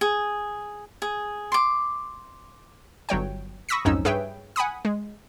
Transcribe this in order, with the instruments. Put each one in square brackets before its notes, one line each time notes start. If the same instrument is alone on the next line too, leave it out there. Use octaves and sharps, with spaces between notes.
[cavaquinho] G#4
G#4
C6 D6
[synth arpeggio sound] G1 F#3 C#5 G5
B5 C#6 D#6 E6 A#6 B6
B1 F2 G#2 C#4 D#4 E6
G2 G#4 B4 C#5 E5 G5
F#5 G#5 B5 D#6
G#3